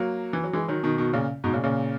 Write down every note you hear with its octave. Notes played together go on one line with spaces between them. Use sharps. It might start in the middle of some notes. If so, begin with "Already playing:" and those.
Already playing: F#3 A#3
E3
F#3
E3 G#3
D#3 F#3
B2 D#3
B2 D#3
A#2 C#3
G#2 B2
A#2 C#3
A#2 C#3